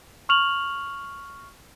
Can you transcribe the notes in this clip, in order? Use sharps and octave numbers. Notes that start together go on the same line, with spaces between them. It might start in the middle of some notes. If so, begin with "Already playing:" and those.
C#6 F6 F7 F#7